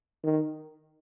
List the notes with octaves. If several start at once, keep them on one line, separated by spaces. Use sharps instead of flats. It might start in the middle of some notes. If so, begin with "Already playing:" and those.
D#3